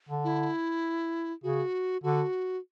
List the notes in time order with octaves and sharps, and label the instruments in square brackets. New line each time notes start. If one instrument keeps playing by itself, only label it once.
[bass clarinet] D3
[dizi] E4
[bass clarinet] C#3 [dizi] F#4
[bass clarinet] D3 [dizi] F#4